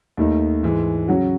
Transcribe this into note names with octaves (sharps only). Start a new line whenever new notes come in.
D#2 D#3 A3 D#4
G#2 E3 G#3
C#3 F#3 C#4 F#4